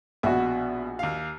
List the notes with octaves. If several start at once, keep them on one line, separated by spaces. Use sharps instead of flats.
A#1 B2 F#4 E5
D#2 F5